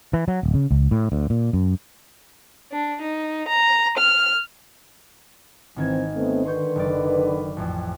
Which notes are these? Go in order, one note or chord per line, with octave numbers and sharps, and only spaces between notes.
E3
F#3
D1
C#3
C#2
A2
D2
A#2
F#2
D4
D#4
A#5
F6
G#1 D#3 E3 C4 G#6
A3 B3 C4
D3 D#3 B4 C6 C#6 G6
F#1 D5
A1 F2